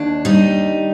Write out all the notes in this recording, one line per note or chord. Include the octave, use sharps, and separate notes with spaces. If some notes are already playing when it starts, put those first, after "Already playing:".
Already playing: D#2 D4
G3 D#4